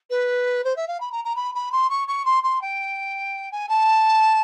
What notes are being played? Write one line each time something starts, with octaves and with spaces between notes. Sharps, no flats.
B4
C5
E5
F5
B5
A#5
A#5
B5
B5
C6
C#6
C#6
C6
C6
G5
G#5
A5